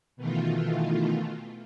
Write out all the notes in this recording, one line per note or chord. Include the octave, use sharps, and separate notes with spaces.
B2 D#3 E3 A3 F4